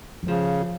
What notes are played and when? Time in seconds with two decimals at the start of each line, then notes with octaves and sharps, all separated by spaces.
0.23 F#3
0.28 C#3 F3